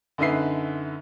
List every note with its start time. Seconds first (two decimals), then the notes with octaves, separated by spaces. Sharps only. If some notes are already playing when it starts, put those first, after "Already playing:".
0.18 F#2 D3 D#4 B4 E5 C7